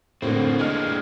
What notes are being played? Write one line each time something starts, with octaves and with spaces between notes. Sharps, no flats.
A2 D3 A#3 C4
G#3 D4 D#5 F6